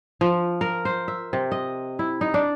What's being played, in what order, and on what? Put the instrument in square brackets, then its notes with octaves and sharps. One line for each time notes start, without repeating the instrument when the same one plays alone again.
[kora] F3
A#4
C5
E5
C3
D#5
E4
D#4
D4